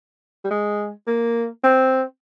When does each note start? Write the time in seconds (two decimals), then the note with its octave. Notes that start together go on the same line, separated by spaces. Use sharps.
0.44 G3
0.51 G#3
1.07 A#3
1.64 C4